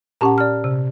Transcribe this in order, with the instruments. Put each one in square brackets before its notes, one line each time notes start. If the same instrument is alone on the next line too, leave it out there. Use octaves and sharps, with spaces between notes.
[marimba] A#2 C#4 F#5 [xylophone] G4 A5 A#5
[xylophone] D5 F6
[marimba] C3